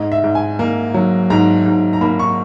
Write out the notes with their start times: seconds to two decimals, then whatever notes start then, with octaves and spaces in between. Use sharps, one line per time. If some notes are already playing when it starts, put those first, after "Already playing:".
Already playing: G#2 D#5
0.12 E5
0.24 G#2
0.35 G#5
0.59 A#3
0.94 F#3
1.30 G#2 A#5
1.66 G#2
1.93 A#5
2.01 A#3 B5
2.19 C#6